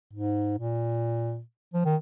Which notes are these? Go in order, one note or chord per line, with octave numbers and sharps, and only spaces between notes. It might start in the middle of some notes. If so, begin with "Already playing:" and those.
G#2
A#2
F3
D#3